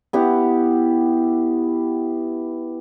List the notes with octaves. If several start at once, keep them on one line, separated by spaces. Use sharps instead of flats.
B3 E4 G4 F#5